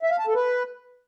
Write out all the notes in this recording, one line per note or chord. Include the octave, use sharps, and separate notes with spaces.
E5
F5
A5
A4
B4